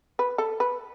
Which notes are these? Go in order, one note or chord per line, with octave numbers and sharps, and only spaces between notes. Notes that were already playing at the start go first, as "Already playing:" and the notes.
B4
A4
B4